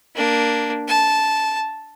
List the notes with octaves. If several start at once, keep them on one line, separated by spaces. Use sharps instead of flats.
A#3 D4
A5